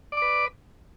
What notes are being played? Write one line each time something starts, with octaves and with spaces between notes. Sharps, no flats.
B4 D5 D6